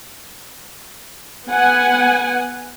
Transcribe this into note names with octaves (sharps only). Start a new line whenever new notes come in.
B3 F#5 G#5